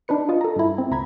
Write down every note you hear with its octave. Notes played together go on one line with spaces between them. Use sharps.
D4 D#4 B4 C#7
F4 D#5 A5
A4 A#5
G2 E4
C4
C#2 A#5 B5 G#6